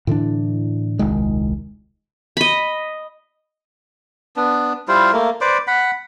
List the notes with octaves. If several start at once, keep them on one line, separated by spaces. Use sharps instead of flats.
A2 D3 E3 D4
D#1 C2 D#3 G#3
D#5 B5
B3 D4
G3 E4 F4 C5
A3 A#3
B4 C5 D5 D6
F#5 B5